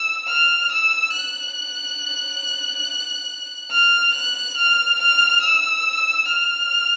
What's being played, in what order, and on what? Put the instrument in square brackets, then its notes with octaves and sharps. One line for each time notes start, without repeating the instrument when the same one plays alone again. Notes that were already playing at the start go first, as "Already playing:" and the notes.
Already playing: [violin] E6
F6
E6
F#6
F6
F#6
F6
F6
E6
F6